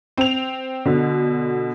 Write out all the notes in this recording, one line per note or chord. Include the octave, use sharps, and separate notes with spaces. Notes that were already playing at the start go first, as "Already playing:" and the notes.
C4 F7
B2 D3